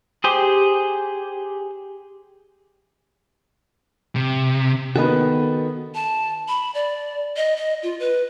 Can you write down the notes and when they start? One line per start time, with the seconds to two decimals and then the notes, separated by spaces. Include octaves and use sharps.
0.24 G4 G#4 C5
4.16 C3
4.96 D#3 B3 F#4 A4 D#5
5.95 A5
6.48 B5
6.75 D5
7.36 D#5
7.57 D#5
7.83 F4
8.00 B4